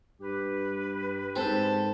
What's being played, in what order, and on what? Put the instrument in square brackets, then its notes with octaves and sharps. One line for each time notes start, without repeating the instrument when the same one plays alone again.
[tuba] G2 [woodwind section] G4 B4
[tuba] G#2 [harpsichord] C4 [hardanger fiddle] A4